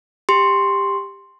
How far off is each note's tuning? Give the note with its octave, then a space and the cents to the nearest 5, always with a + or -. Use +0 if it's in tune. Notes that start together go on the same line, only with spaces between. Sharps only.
G4 +15 C6 +0